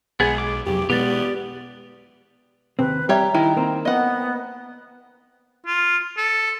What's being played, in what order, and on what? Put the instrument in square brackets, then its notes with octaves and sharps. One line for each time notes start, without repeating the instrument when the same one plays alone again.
[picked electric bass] B1 [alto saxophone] G#3 [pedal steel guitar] B3 G#4
[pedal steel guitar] D6
[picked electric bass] F2 C3 F#3 [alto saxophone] G4
[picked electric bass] B2 G#3 [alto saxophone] B3 [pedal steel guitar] G4 D5
[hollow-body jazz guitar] D#2 C3 C4 [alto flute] B4
[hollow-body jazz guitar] G3 [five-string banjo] G4 C#5 E5 [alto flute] A#5
[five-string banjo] D#3 [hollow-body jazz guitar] E4
[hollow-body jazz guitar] A#3 C4
[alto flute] B3 [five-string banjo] D#5 F#5
[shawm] F4
A4